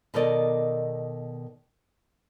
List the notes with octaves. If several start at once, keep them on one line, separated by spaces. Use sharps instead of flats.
B2 D#3 A4 A#4 D5 D#5